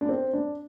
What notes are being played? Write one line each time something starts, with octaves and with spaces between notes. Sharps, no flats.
D4
C4
D4